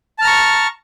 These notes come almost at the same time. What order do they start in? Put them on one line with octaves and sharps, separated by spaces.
A5 F6 A#5 C#6